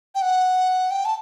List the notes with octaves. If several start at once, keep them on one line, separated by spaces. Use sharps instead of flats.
G5
F#5
G5
A5